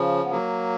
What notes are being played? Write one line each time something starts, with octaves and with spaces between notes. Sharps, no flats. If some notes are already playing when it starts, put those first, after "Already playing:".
Already playing: C#3 F3
B3
F#3 A#3